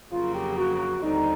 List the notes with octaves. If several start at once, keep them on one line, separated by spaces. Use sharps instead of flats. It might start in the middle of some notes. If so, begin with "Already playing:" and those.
F2 C#3 F#3 A#3 F4
G4
F#4
D#2 D3 G3 C4 D#4